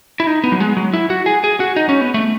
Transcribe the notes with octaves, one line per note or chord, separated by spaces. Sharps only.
E4
D#4
B3
F#3
G#3
F#3
E4
F#4
G#4
G#4
F#4
D#4
C#4
B3
A3